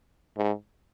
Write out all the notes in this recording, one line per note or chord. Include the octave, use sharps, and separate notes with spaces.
G#2